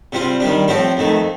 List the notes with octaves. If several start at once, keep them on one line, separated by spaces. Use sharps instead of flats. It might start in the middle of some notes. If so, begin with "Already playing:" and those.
C3 G3 C4 F4
D#3 G3 D4
A2 F3 C4 G4 C5
F2 D#3 A3